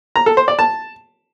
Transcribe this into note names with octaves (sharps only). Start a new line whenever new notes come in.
A#5
A4
C5
D5
A5